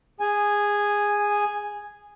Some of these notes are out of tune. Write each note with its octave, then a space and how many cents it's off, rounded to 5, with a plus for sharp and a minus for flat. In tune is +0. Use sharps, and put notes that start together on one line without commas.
G#4 -20 G#5 +0